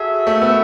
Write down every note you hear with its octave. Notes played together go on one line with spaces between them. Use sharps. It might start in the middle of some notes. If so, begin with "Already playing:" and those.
Already playing: F#4 G#4 A4 E5
A3
B3